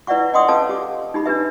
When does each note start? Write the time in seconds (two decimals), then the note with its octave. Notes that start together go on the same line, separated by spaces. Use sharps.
0.07 E4 B4 D5 E5 F#5 C#6
0.34 D#5 F#5 G5 C6 C#6 D#6
0.48 C#4 A4 B4 D#5 F5 A5
0.69 G4 D6
1.14 D#4 G4 B5
1.26 D4 G4 B4 E5